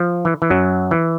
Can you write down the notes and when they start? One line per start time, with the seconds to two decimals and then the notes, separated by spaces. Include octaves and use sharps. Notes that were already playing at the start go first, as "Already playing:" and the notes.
Already playing: F3
0.25 E3
0.42 E3
0.50 F#2 F#3
0.91 E3